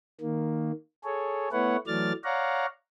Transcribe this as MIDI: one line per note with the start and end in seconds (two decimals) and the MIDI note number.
0.21 0.71 51
0.21 0.71 58
1.04 1.48 68
1.04 1.48 69
1.04 1.48 73
1.52 1.77 57
1.52 1.77 59
1.52 1.77 64
1.52 1.77 71
1.52 1.77 73
1.52 1.77 78
1.87 2.13 52
1.87 2.13 54
1.87 2.13 57
1.87 2.13 74
1.87 2.13 89
1.87 2.13 93
2.24 2.66 73
2.24 2.66 74
2.24 2.66 77
2.24 2.66 78
2.24 2.66 82